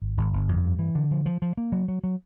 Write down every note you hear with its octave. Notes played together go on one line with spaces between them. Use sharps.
G#1
G#1
G1
F2
G2
E3
D3
F3
F3
F3
A#3
F#3
F#3
F#3